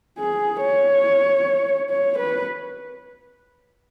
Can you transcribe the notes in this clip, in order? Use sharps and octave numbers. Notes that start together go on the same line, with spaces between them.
G#4
C#5
C#5
B4